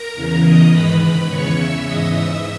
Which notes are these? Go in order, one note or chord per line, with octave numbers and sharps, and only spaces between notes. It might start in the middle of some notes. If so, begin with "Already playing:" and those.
Already playing: A#4 A#5
E2 C#3 E3
D#5 D#6
G#2 D#3 B4 B5
B4 B5
E2 C#3 E3 C#5 C#6
E5 E6
G#2 E3 D#5 D#6
E5 E6